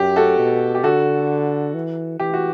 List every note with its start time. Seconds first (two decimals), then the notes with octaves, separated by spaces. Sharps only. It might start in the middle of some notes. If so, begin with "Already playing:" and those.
Already playing: F#2 G4
0.16 F#4 A4
0.38 B2
0.75 G4
0.83 D3 F#4 A4
1.74 E3
2.19 E3 G4
2.34 F#4